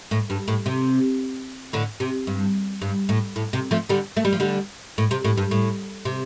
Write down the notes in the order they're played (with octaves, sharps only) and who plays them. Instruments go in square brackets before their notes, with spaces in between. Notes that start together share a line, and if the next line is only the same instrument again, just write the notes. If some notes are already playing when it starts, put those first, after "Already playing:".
[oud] A2
G2
A2
C3
A2 D3
C3
G2
G2
A2
A2
C3
F3 A3
D3 G3
A3
G3
F3
D3 G3
A2
C3
A2
G2
A2
C3